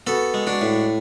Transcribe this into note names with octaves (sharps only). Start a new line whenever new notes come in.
B3 F#4 A4
G#3
D4 F#4
A2